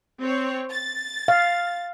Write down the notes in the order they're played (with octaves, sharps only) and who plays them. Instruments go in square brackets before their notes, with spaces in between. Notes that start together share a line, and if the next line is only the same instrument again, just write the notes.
[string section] C4 C#5
A6
[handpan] F5